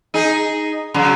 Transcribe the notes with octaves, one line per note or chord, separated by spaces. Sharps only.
D#4 G#4
C#3 F#3